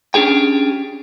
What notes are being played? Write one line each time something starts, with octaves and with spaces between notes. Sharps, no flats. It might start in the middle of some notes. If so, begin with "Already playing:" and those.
C#4 D4 G4 G#4 G5